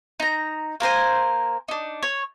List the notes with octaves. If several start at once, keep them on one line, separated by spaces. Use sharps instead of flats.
D#4 A#5
A#3 A#4 C5 G#5
D4 D#4
C#5